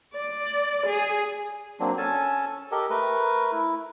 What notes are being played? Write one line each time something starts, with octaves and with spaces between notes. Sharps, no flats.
D5
G#4
F#3 A#3 C4 D4
C#4 A4 G#5 A5
G4 A4 A#4 D#5
A3 A#4 B4
E4